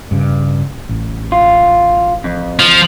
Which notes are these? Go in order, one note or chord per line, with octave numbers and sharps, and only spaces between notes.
G2 C#3
A1
F4
F2
F3